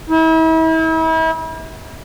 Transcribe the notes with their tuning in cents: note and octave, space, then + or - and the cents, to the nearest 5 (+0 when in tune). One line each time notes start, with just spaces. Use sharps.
E4 -40